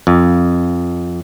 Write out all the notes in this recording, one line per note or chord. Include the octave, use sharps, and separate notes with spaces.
F2